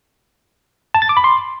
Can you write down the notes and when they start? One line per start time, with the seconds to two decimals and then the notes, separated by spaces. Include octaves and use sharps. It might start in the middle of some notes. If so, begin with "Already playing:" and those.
0.95 A5
1.02 A6
1.09 D6
1.17 B5
1.24 C6